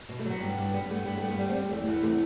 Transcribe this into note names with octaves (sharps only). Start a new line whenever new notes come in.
B2
A3
F#3 B3
G2
G2
G3 B3
G2 A3
G2 B3
A3
G2
B3
G3 A3
A3 C4
G3
E2 A3
A3
E2 B3
C3 A3